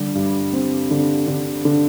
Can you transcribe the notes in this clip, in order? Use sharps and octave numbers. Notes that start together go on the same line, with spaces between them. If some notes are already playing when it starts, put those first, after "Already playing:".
Already playing: D3 G3
G2
C4
D3
D3
D3